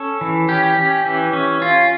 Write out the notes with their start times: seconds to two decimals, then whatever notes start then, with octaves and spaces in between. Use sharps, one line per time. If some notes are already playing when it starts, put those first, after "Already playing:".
Already playing: C#4 A4
0.21 E3
0.49 C#4 G4
0.77 C#4
1.05 E3
1.33 C#4
1.62 C#4 F4